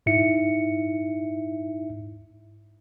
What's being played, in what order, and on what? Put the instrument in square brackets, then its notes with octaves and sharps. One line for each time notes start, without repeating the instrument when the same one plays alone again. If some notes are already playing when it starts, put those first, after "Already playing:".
[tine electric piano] G#2 D#4 E4 E5 C#7